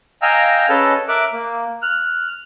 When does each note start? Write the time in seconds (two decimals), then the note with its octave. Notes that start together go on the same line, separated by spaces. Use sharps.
0.22 D#5 F5 G5 G#5 A#5 E6
0.69 C#4 G#4 A4 B4 D#5 A5
1.08 A#4 E5 D6 F#6
1.33 A#3
1.82 F6 F#6